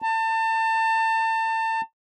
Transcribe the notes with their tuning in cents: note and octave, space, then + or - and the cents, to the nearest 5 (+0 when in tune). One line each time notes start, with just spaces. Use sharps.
A5 +30